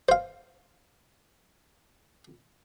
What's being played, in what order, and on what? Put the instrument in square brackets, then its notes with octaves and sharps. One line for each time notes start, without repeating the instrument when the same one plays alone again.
[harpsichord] C5 F5